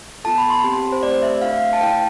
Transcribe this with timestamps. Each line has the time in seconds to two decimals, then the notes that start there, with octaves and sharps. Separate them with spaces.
0.24 B3 F4 A4 A5
0.38 B5
0.50 C6
0.64 C4 G4
0.92 C5
1.03 A3 C4 G4 D5
1.22 E5
1.42 A3 D4 F4 A4 F5
1.61 F5
1.73 A5
1.81 A3 E4 A4 G5